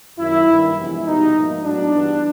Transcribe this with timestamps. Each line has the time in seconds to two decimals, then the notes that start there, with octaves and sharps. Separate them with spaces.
0.18 F#2 D#3 F#3 A#3 E4
0.48 G2 D#3 G3 A#3
0.76 F2 C3 E3 G#3 B3 E4
1.05 B2 G3 B3 D#4
1.35 G#2 F3 A#3
1.63 A2 F#3 B3 D4
1.91 G2 E3 G3 B3